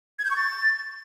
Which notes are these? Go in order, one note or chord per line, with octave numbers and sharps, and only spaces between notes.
G#6
G6
C#6
A6